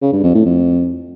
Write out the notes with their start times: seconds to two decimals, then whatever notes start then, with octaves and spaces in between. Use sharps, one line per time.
0.02 C#3
0.13 G2
0.24 F2
0.34 A2
0.45 F2